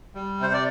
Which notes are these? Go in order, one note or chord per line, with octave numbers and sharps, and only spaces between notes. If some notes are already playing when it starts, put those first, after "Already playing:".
G3
C3 C5
D5